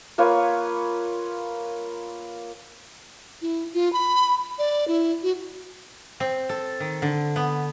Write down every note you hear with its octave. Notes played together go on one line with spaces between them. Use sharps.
A#3 F4 B4 C#5
E4
F4
B5
D5
E4
F#4
C4
A4
D#3
D3
B3